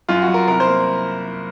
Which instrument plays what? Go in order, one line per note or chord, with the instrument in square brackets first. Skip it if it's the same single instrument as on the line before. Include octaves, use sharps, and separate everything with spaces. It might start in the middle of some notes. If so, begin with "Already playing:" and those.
[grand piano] F#2 F4
F#4
F#2
A#4
C2 A#4
C5
A#3